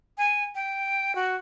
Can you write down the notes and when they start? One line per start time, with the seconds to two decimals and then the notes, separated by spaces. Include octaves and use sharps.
0.18 G#5
0.55 G5
1.15 F#4